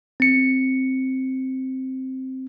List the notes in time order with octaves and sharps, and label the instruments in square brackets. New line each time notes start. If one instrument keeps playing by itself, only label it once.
[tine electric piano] C4 C#7